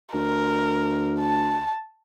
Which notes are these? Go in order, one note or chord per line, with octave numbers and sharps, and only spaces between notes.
D2 A#4
A5